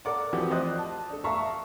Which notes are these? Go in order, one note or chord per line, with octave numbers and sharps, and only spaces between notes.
A4 A#4 D5 F#5 D6
E3 F3 C4 E4 F#4 G4
C5 D5 D#5 D#6 F#6
A5
D4 A4
E5 F5 A5 A#5 C#6